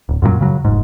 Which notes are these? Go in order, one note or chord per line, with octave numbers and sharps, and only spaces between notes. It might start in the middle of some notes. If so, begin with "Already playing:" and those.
D1
F#2 A#2 E3 F#3
F#2 C#3 F3 F#3
F1 G#2